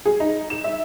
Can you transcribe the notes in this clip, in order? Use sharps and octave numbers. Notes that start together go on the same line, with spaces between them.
G#4
D#4
E7
E5